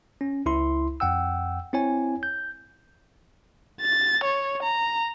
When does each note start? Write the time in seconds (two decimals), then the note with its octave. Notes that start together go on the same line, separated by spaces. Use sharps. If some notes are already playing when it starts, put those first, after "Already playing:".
0.21 C#4
0.46 C#2 E4 C6
1.00 F2 F#5 G5 E6
1.73 C4 E4 C#5 G#5
2.23 G6
3.81 A6
4.24 C#5
4.63 A#5